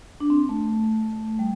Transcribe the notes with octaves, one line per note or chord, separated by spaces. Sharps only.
D4
C4
A3
G3